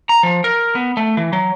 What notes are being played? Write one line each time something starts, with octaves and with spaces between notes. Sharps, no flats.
A#5
F3
A#4
B3
A3
E3
F#3